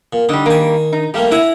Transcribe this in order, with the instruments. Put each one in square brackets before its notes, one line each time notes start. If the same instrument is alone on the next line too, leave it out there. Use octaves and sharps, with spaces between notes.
[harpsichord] A#2
[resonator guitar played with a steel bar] D3 G3 [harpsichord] D#4
[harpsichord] D#3 G#5 [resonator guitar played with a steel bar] G3 A#3
[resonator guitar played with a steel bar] D#4
[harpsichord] G3 A3 A#3 [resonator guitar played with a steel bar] G4 F5
[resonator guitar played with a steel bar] E4 [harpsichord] F#5 G#5 A#5